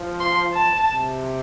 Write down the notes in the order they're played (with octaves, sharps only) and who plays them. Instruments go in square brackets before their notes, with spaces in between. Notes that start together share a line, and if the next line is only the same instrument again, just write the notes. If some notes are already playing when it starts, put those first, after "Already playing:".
Already playing: [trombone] F3
[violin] C6
A5
[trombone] C3